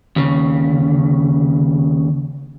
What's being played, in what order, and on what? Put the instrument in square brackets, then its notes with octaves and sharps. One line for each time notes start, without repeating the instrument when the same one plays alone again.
[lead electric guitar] D#2 C#3